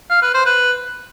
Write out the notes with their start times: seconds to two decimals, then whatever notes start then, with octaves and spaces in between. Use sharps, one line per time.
0.11 F5
0.22 B4
0.34 C5
0.46 B4